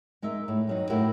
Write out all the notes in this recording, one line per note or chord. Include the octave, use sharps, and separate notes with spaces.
G#3 D#4 A#4 E5
A2
G2 F#3 D#4
A2 E4 F#4 G4 A#4